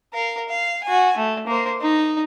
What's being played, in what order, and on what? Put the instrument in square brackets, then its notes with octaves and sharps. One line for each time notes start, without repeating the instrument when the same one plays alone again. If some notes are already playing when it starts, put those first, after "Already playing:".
[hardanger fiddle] A#4 F5
F5
F#4 G#5
A3
A#3 C5
D#4